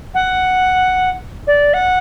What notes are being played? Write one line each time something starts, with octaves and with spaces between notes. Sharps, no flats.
F#5
D5
F#5